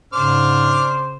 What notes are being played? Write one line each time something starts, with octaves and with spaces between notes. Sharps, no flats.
G#2 C#3 D4 C5 D6 F6